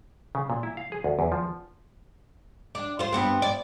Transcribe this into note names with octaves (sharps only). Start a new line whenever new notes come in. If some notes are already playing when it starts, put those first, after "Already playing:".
C#3
A#2
E4
F5
G#4
D2
E2
F3
D4
F4 C5
G2 B3 C4
D5